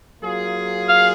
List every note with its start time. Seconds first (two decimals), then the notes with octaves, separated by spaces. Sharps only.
0.22 F#3 A#3 F4 G#4
0.89 F5